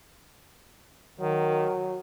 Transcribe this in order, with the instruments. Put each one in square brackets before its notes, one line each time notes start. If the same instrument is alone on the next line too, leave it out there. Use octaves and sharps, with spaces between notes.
[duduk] D#3 [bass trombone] F#3